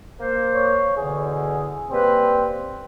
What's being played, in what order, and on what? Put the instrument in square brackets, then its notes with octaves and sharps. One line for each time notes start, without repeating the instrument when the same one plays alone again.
[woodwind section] A#3 C5
[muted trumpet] C#5
[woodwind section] E2 B2 D3 [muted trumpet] G#4
[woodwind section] G3 A#3 B4 [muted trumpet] C4